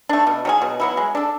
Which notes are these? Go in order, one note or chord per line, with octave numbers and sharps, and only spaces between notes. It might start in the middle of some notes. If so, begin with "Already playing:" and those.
A3 D4
B2
F#3 C#4 G#4
B2
F#3 B3 E4
G#3
D4 A4